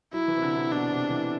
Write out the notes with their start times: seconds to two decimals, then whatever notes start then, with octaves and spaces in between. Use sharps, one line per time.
0.13 F#3 E4
0.28 E3
0.37 C3
0.42 D3
0.56 C3
0.71 B2 D4
0.91 C3
1.10 E3